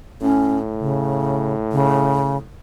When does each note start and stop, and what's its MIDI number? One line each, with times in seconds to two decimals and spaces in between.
0.22 2.43 45
0.22 0.58 61
0.80 1.54 49
1.72 2.37 49